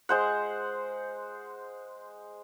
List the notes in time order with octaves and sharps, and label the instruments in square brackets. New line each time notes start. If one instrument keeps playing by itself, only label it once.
[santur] G#3 C5 F#5